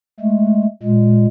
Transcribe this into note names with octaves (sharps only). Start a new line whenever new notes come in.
G#3 A3
A#2 G#3